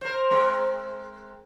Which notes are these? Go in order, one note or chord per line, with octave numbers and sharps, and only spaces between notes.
A#4 C5
G#3 C4 A#4